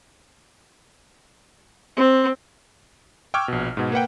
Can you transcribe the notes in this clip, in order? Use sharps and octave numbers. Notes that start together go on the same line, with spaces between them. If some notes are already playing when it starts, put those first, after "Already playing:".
C4
G5 C#6 D6 E6 F6 G#6
A#1 B2
G#2 B2
A#3 B4 F#5 G5